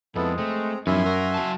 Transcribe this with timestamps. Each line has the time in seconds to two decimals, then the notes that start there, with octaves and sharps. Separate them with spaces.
0.16 F2 G#3 B3 C4 E4 A4
0.37 A3 C4 G#4 A#5
0.87 F#2 F3 B3 D#4 E4 E5 G#5 C6
1.06 F#4 A#4
1.34 F#3 A5